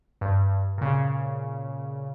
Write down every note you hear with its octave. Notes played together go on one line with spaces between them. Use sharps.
G2
A#2 C#3